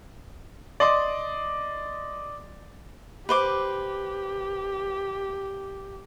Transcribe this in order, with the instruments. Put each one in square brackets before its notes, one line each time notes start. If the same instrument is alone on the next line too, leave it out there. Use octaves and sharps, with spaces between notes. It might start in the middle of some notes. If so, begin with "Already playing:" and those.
[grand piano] D5 D#5 C6 D6
[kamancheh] G4 [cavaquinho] B4 C5 D6